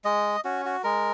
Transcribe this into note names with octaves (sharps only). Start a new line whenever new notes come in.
G#3 D#5
C#4 F#4
F#4
G#3 A#4